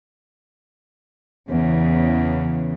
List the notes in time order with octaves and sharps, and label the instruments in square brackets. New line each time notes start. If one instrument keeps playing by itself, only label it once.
[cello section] E2 C#3